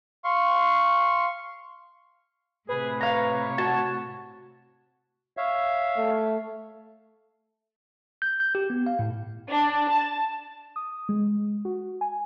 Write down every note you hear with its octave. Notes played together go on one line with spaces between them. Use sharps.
F5 C6 C#6
A2 C3 G#4 B4
C#5 F5 A#5
F#4 A5
C#5 E5 F5
A3
G6
G6
G4
B3
F5
A2
D4
A5
D#6
G#3
F#4
G#5